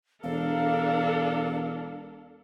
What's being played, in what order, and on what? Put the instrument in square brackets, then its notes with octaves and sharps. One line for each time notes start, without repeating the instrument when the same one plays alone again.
[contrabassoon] E1 [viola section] D4 A4 A#4 [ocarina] F5